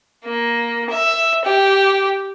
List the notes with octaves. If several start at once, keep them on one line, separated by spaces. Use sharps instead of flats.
A#3
E5
G4